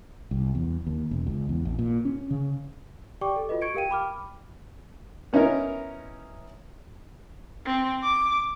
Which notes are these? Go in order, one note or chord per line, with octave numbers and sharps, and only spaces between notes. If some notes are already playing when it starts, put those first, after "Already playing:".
C2
E2
D#2
E1
C#2
E2
A1
A#2
C#4
C#3
G4 D5 G5 C#6 D6
A4
F4 F#4 B4 D#5
C#6 G#6 C#7 D7
G4 A#4 F5 G5 D#7
G5 B5 D6 F6
B3 C#4 D#4 E4 A#4
C4
D6